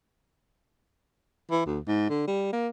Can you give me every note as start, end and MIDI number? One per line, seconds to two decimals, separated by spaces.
1.51 1.62 52
1.65 1.79 38
1.87 2.09 44
2.09 2.23 50
2.27 2.48 55
2.52 2.68 58